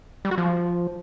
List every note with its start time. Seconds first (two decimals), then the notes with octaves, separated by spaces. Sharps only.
0.25 G3
0.31 F#4
0.38 F3